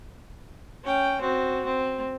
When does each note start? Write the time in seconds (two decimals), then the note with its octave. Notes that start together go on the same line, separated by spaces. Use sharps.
0.84 C#4 G5
1.21 C4 F#4
1.65 C4